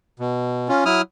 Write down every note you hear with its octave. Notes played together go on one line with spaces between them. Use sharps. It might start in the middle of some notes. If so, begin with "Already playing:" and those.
B2
C#4 F4
F#3 E4 D#6 F6